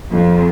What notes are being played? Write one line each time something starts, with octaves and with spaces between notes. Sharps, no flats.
F2